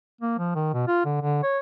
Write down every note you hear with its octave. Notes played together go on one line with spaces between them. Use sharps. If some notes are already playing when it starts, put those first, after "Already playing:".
A#3
F3
D#3
B2
F4
D3
D3
C#5